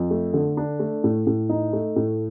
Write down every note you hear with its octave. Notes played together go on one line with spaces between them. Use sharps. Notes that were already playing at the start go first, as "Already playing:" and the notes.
Already playing: F2
A3
D3
D4
A3
A2
A2
D#4
A3
A2